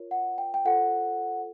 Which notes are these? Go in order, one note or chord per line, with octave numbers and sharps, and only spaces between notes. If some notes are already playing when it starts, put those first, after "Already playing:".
Already playing: F4 A#4 C#5
F#5
G5
G5
F4 A4 C5 F#5